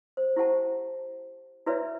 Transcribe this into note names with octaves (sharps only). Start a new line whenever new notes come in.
C5
E4 G4 C5 F#5 A5
E4 F#4 B4 C#5 D5 E5